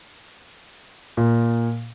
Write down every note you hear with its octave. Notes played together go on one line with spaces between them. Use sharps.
A#2